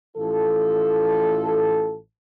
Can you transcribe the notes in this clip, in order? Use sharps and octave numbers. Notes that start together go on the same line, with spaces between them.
A1 E3 F4 A4